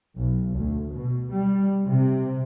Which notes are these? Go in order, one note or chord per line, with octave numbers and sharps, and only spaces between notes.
B1
D2
B2
G3
C3